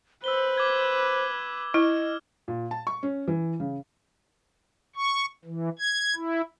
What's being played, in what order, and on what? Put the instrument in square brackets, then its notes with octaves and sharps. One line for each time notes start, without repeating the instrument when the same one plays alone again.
[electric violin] B4 [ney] C5 [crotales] E6 G7
[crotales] D6 G#6
[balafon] E4 [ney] D#5 [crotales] F6
[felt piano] A#2
A5
C#6
C#4
E3
C#3
[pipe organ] C#6
E3
G#6
E4